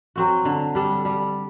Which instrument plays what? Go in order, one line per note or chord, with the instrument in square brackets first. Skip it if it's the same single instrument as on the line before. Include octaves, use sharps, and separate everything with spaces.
[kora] F#3 C4 F#4
D3
G3 D4 A4
G3